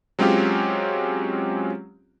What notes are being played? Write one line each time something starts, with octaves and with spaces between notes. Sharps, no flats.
F#3 G#3 C4 C#4 F4 G4